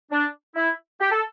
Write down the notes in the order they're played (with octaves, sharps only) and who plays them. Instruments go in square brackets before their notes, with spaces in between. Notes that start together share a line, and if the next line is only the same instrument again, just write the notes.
[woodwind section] D4
E4
G4
A4